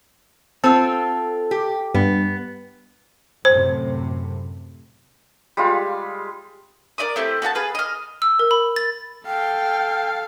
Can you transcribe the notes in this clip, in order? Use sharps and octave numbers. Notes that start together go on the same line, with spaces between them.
C4 F4 A4
G4
G2 B3
F#2 A2 C3 C5
G3 G#3 F4
A#4 D5 D#5 D#6
A3 C4 E4 G4
B3 F#4 F#5 A5
G#4 B4 F5
D#5 F6
E6
A#4
B5
A6
A4 F5 G5